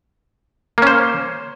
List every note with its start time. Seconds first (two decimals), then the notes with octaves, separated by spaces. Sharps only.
0.78 A#3
0.82 C#4
0.87 C5